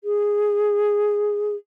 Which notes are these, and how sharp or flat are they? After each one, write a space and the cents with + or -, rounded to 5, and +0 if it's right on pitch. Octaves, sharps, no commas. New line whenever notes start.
G#4 -5